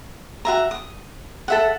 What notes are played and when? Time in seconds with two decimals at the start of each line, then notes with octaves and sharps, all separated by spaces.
0.45 F#4 E5 A#5
0.71 D#6
1.48 A4 E5 F#5